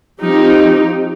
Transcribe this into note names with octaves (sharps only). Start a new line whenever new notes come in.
F3 C4 D#4 G4